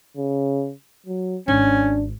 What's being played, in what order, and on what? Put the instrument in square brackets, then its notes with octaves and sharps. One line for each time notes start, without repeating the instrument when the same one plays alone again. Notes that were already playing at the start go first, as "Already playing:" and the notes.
[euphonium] C#3
F#3
[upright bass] G#1 [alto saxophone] C#4 [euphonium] D4